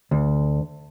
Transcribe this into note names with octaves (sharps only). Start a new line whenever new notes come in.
D2